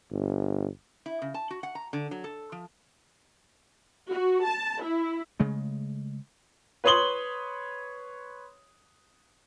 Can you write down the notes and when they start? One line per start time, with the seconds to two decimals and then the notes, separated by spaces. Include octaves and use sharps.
0.11 G1
1.06 E4
1.22 C#3
1.34 A5
1.51 F#4
1.63 F#5
1.75 A#5
1.93 D3
2.11 F#3
2.24 A4
2.52 F3
4.10 F#4
4.45 A5
4.82 E4
5.40 C#3 G#3 A3
6.84 B4 C#5 C6 D#6 F#7 G7